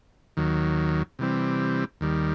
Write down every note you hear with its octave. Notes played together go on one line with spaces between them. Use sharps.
D#2 D#3 F#3
C3 E3 G3 C4
D#2 D#3 G3